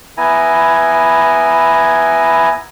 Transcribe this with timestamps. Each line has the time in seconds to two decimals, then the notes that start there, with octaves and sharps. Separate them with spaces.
0.17 B3 E4 G#5 A#5